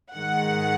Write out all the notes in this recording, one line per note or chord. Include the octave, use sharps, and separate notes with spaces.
G#2 D#3 G#3 F#5